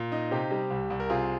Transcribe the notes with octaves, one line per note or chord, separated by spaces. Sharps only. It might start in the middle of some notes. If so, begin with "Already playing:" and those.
Already playing: A#2
D#4
C3 G4
G3
C2
C2
A#4
C3 F4 G#4